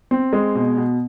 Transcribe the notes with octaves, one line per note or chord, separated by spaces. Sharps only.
C4
G#3
B2
B2